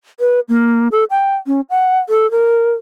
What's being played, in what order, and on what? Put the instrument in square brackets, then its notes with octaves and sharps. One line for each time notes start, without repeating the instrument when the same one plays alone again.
[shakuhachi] B4
A#3
A4
G5
C#4
F#5
A4
A#4